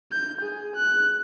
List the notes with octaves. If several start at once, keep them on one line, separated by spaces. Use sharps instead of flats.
G6
G#4
F#6